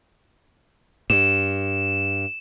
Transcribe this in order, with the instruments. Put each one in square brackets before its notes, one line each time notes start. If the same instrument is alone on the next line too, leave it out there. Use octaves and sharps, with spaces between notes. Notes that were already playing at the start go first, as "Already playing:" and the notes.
[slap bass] G2 [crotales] E7